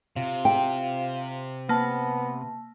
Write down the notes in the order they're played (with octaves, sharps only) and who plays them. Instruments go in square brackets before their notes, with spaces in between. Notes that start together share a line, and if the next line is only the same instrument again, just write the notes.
[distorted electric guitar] C3 [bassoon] F4
[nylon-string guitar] G5
[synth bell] A#3 A5 [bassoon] B3